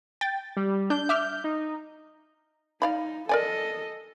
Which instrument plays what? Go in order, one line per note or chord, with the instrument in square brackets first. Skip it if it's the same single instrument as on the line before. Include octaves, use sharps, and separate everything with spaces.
[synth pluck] G5 A6
[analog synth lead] G3
[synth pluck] D4 [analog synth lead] G6
[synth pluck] E5 D6 F6
[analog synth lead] D#4
[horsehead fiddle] D#4 [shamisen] D5 F5 B5
[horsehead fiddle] A4 D#5 [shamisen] A#4 D5 G#5